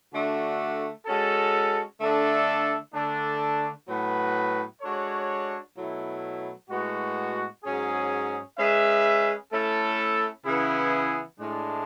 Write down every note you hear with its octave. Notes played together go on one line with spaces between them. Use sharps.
D3 A3 D4 F#4
G#3 C#4 F#4 A4
D3 A3 D4 A4 E5
D3 A3 D4
A2 F#3 B3 F#4 B4
G#3 D4 F#4 A4 C#5
B2 F#3 A3 E4
A2 G#3 B3 F#4
G#2 F#3 C#4 G#4
G#3 C#4 G#4 B4 E5
A3 C#4 E4 A4
C#3 E3 B3 E4 G#4
A2 G#3 D4